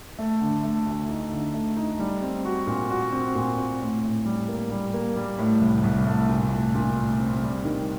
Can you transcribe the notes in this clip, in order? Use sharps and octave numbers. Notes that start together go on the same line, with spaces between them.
A3
D3
A3
D2
D#4
D3
A3
D#4
G3
C4
F#4
A#2
F#4
C4
A#2
C4
A2
A2
G3
A#3
G3
A#3
G3
A2
C2
C2
A3
A#2
A3
A#2
A3
C4
G3
D#3